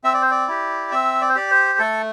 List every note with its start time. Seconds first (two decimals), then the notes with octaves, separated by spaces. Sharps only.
0.04 C4 E5
0.14 D5
0.22 C5
0.31 D5
0.48 E4 G4
0.92 C4 E5
1.21 D5
1.29 C5
1.35 G4 D5
1.51 C5
1.79 A3 A4